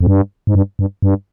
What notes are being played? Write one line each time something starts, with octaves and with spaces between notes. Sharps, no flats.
F2
G2
G#2
G2
G2
G2